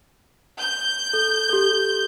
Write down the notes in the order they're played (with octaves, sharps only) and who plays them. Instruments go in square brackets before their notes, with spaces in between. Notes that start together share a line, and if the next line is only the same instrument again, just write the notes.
[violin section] G6
[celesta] A4
G4 A4